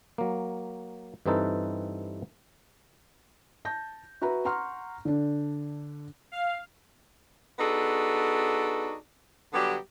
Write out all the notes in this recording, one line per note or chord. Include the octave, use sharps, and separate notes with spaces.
F#3 A#3
G2 E3 C4 D#4 A4 B4
A5 G6 A#6
F#4 B4 E5 A#5 B5
F#5 A#5 C6 C#6 F6
D3 D4
F5
B3 D4 D#4 F#4 G#4 A4
D3 F#3 G3 B3 G4